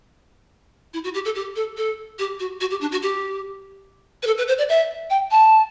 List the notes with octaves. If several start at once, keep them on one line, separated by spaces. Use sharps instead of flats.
E4
F#4
G4
A4
G4
A4
A4
G4
F#4
F#4
G4
D4
F#4
G4
B4
A4
B4
C5
D5
E5
G5
A5